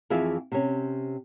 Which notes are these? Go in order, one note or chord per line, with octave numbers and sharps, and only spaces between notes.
F2 E3 F4 G#4 E5
C3 C#4